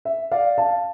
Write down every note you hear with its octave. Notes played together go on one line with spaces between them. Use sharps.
E5
D5 F5
F5 A5